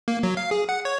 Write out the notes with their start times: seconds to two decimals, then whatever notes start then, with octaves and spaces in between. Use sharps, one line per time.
0.08 A#3
0.23 F#3
0.37 F5
0.51 G#4
0.69 F#5
0.85 C#5